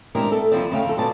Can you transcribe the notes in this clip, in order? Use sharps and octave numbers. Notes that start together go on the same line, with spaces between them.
G#3 C4 D4 E4 G4 A#4
A3 A4
D#2 F3 G3 C4 D5
D2 C#3 A3 F5 G5
F2 A4
F2 B2 D5 A5